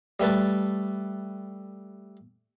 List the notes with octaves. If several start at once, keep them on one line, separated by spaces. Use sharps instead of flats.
G3 A3 B4 A5